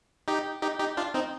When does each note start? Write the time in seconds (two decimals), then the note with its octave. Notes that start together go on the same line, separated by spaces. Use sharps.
0.28 D#4 G4
0.62 D#4 G4
0.80 D#4 G4
0.97 D4 F4
1.14 C4 D#4